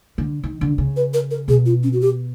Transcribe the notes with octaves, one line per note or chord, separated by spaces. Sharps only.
D3
D#3
D3
C#3
B4
A#4
A#4
B2 G#4
F4
C#4
F#4
G4